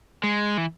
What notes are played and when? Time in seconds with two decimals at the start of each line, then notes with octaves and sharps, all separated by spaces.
0.23 G#3
0.57 E3